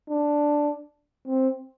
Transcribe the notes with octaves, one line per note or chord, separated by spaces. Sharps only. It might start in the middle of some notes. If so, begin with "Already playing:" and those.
D4
C4